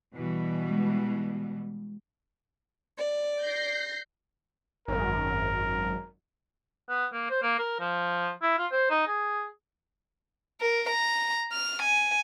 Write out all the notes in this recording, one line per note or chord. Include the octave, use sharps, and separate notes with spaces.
B2 E3 G3
G#3
D5
G6 A#6 C7
G#1 F#2 A#4
B3
A#3
C5
A#3
A#4
F3
E4
F4
C5
D#4
G#4
A#4
A#5
F6
G#5